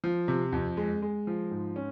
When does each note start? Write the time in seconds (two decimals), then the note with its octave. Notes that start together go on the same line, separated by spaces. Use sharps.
0.04 F3
0.28 C3
0.53 F2
0.77 G#3
1.02 G#3
1.27 F3
1.51 G#2
1.76 C#4